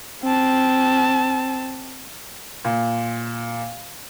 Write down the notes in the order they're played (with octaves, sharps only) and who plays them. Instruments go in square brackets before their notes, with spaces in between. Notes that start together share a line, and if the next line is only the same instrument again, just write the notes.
[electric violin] C4 A5
[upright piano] A#2